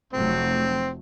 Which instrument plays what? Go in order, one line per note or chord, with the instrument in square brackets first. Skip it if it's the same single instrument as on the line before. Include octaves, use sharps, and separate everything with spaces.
[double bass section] F1 F#3 A3 [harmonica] C4